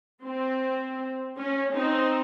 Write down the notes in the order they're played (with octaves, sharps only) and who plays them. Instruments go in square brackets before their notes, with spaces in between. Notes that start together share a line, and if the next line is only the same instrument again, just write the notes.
[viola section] C4
C#4
C4 D#4